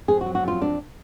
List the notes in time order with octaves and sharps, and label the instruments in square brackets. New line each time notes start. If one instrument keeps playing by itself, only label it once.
[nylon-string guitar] F2 G#4
F#4
F#3
F#4
F2 F4
F2 D4